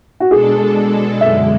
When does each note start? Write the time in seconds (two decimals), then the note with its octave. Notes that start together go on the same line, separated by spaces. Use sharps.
0.20 F#4
0.30 B2 G#3 D4 G#4 A4
1.21 F#2 D3 G#3 E5